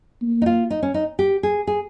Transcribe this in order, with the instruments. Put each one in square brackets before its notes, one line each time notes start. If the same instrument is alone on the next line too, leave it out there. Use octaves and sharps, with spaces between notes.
[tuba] A#3
[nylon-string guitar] D#4
F4
D#4
C#4
D#4
G4
G#4
G#4